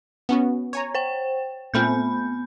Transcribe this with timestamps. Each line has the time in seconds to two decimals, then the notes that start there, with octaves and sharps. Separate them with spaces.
0.29 B3 C#4 F#4
0.73 C#5 G#5 A#5
0.94 C5 G5
1.74 A#2 A3 B3 C4 B5 G6